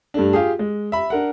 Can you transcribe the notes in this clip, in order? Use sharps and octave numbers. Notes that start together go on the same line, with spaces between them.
G2 A3 D4
F4 G4 G#4
G#3
E5 B5
D4 A#4 F#5